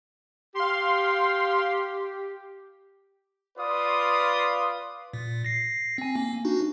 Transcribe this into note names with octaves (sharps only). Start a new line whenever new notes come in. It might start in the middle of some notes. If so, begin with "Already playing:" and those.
G4 F5 C6
F4 B4 D5 F5 C6 D#6
A#2
A#6 C7
C4 G#5
A#3
D4 D#4 F#4